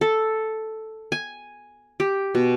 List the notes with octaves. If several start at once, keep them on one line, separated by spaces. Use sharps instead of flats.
A4
G#5
G4
B2